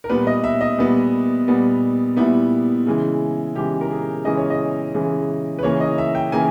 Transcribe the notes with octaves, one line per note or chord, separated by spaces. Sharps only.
A#4
A#2 G3 B3 B4
D#5
E5
D#5
A#2 G3 B3
A#2 G3 B3
A#2 G3 B3 E4
C#3 E3 G#3
C#3 E3 G#3 G4
A#4
G#4
C#3 E3 G#3 D#5
C#5
D#5
C#3 E3 G#3
B4
C#3 E3 A#3 C#5
D#5
E5
G5
C#3 E3 A#3 G#5